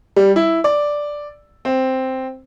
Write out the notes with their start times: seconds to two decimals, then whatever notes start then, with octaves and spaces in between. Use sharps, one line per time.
0.16 G3
0.36 E4
0.64 D5
1.65 C4